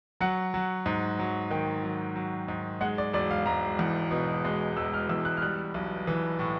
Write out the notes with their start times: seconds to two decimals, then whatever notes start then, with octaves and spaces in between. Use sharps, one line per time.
0.21 F#3 F#5
0.54 F#3
0.86 G#2
1.19 F#3
1.51 D#3 G5
1.83 F#3
2.16 F#3
2.48 G#2
2.81 G#3 F#5
2.98 D5
3.13 E1 D5
3.31 F5
3.46 E1 A#5
3.79 E2
4.11 B2
4.45 G#3
4.77 E1 E6
4.93 F6
5.09 E2 E6
5.25 F#6
5.37 F6
5.42 G3 F#6
5.74 B1
6.07 E3
6.39 A2